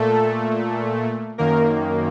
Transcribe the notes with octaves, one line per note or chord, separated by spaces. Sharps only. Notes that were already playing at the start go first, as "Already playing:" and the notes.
Already playing: A#2 A3 A4
F#2 D#3 A#3 A#4